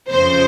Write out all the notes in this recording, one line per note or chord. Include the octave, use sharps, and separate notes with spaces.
F2 C#3 F3 C5